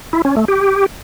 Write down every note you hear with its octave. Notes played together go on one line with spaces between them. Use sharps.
E4
C#4
A3
G4